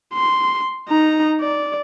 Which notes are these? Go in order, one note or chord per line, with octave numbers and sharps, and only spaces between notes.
C6
D#4 A#5
D5